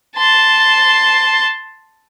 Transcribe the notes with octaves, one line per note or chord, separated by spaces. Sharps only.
A5 C6